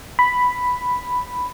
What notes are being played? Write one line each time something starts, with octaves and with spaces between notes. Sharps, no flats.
B5